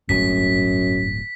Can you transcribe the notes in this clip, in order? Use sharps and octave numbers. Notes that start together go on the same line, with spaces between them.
D1 G1 F#2 B6